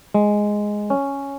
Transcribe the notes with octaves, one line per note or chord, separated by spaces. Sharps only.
G#3
C#4